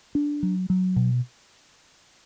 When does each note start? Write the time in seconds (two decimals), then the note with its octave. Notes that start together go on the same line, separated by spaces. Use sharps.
0.15 D4
0.43 F#3
0.70 F#3
0.96 B2